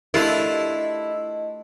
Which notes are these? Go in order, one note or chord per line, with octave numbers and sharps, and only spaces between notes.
A3 D4 E4 F4 G4 A#4 D#5